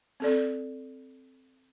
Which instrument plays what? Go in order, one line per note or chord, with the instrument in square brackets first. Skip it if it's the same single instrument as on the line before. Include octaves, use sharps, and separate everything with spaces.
[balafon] C4 A4 D5